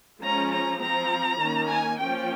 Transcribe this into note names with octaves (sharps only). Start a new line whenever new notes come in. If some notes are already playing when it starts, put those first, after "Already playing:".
F3 G#3 C#4 A#5
A#5
F3 C4 A#5
D#3 A#3 C#4
G#5
F3 A#3 C#4 G5